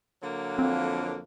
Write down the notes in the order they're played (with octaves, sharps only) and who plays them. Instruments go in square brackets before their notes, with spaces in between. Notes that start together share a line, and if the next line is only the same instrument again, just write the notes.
[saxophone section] D3 F#3 A#3
[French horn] F2 [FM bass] C4